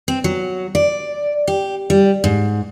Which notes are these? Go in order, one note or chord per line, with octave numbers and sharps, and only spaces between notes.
C4
F#3
D5
G4
G3
G#2